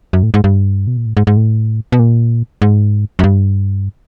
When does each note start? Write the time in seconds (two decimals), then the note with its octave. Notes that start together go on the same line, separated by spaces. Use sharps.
0.13 F#2
0.23 A2
0.34 G#2
0.44 G2
0.87 B2
0.97 A#2
1.06 A2
1.17 G#2
1.27 G#2
1.37 A2
1.92 B2
1.99 A#2
2.62 G#2
3.19 F#2
3.24 G2